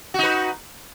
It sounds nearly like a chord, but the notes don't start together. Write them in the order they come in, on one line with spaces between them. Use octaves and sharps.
F#4 D#4 B4